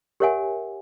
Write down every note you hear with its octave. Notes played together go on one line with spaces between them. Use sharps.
G4 A#4 C#5 E5 F#5 G#5